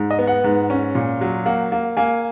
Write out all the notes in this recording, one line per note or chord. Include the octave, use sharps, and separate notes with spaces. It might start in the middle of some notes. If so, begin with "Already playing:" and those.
Already playing: G#2
D#5
B3
F#5
G#2
C#4
A#2
F#3
A#3 F#5
A#3
A#3 G#5